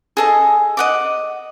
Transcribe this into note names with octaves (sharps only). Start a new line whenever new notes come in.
G#4 A4 D#5
D#5 F#5 D6